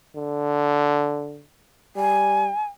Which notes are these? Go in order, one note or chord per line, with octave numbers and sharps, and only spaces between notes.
D3
G3 G#5